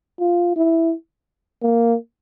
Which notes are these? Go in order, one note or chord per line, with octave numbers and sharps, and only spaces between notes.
F4
E4
A#3